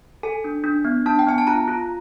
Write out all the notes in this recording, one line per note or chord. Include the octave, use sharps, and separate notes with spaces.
A4 G#5
D4
D4
B3
D4 A5
G5
B3 G#5
A5
F4 A#5
F4